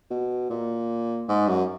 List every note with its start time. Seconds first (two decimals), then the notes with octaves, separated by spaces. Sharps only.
0.10 B2
0.50 A#2
1.28 G#2
1.48 F#2